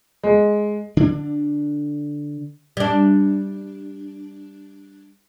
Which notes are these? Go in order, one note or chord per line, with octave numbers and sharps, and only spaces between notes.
G#3
D3 D4
G3 D4